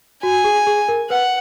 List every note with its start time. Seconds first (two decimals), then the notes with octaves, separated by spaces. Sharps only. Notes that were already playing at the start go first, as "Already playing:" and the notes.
0.23 F#4 G#5
0.44 G#4
0.67 G#4
0.89 A#4
1.10 B4 F#5